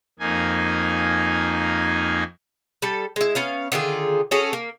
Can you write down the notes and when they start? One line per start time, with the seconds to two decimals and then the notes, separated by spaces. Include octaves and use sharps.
0.19 F2 A#3 D#4 G#5
2.82 G3 A4
3.16 G#3 E4
3.35 B3 C#4 F5
3.72 D3 D#3 F4 G#4
4.31 C#4 F#4 G#4 A4
4.53 A#3